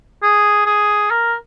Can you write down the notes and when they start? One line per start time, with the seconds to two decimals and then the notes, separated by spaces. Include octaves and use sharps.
0.23 G#4
0.66 G#4
1.11 A#4